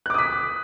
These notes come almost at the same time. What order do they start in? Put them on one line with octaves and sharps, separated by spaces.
F#6 D6 D#6 B6